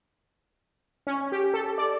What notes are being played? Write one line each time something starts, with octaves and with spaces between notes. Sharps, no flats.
C#4
G4
A4
D5